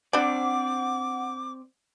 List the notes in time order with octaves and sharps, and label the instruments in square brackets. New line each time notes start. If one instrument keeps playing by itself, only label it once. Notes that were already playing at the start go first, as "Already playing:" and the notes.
[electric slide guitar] C4 D5 [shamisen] D4 C5 B5 [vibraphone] F#5 [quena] D6